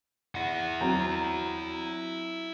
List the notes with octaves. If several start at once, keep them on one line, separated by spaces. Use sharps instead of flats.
E4 F#5
F#3 C4 A#5